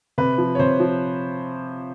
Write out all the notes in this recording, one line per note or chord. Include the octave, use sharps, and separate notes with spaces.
C3 B4
F3
C#5
C3 C5
F3